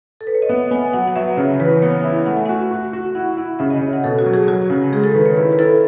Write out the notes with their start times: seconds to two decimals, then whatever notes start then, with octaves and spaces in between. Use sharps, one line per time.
0.21 A4
0.27 B4
0.35 C#5
0.42 D#5
0.49 B3 E5
0.71 B3 G#5
0.93 F#3 F#5
1.07 F#5
1.16 F#3 E5
1.37 C#3 C#5
1.59 E3 B4
1.82 B3 C#5
2.04 E4 E5
2.26 A3 F#5
2.36 G#5
2.46 F#4 F#5
2.71 F#4
2.93 F#4
3.15 E4 F#5
3.37 E4 F#5
3.59 C#3 E5
3.70 D#5
3.81 C#3 C#5
3.93 F#5
4.04 B2 A4
4.19 F#4
4.26 F#3
4.34 G#4
4.48 F#3 F#4
4.70 C#3
4.92 G#3 G#4
5.04 A4
5.14 D#3 B4
5.26 C#5
5.37 E4 B4
5.52 B4
5.59 E4 A4